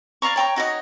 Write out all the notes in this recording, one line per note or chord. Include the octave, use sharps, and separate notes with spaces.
D5 F5 A#5 C#6
C#5 G5 A#5 C#6
D#4 F#4 C#5 D#5